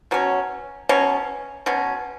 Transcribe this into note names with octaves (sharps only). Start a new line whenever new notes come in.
B2 F#3 C#4
B2 F#3 C#4
B2 F#3 C#4